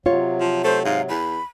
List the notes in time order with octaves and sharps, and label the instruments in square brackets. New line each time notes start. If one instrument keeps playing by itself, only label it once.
[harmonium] C3 F#3 [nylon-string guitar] F4 C#5
[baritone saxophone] F3
[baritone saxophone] A3 [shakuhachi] C5
[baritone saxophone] G#2 [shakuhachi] F5
[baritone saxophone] E2 [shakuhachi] B5